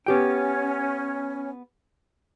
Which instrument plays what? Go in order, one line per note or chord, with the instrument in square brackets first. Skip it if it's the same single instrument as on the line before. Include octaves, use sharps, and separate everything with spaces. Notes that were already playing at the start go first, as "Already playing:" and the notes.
[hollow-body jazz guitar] B3 G4 G5 [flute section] C#4